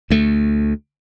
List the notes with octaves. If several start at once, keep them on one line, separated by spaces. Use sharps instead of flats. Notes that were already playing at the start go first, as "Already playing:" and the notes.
D2 A3